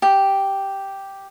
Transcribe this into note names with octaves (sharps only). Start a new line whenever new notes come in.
G4